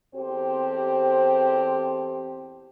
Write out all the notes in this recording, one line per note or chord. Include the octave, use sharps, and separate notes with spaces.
E2 C4 G4 A4 C5